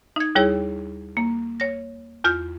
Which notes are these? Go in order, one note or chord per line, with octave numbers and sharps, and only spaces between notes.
D#4 G#6
D#2 G3 E4 G#4 C#5
A#3
C#5 A#6
E2 F4 F6 G6